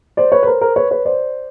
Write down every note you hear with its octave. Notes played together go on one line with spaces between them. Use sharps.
C5 D5
B4 C#5
B4
A#4 C5
A#4 C5
B4 C#5
B4 C#5
C5 D5